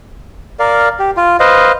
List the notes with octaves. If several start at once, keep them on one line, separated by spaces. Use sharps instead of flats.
A#4 D5 F5
G4
F4
B4 C5 D#5 F5